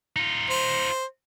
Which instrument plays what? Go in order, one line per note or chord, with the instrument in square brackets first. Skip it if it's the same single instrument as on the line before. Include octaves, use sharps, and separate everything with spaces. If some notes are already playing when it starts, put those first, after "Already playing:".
[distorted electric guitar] D#4 F4
[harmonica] C5